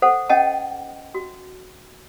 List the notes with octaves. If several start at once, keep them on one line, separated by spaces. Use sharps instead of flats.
A4 C5 F#5
C#4 D#5 F#5 G5 A5
F#4